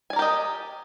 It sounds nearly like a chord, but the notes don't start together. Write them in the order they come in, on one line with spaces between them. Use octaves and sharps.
G#5 D5 A#4 G4 D#5